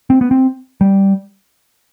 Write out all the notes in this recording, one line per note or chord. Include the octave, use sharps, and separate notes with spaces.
C4
B3
C4
G3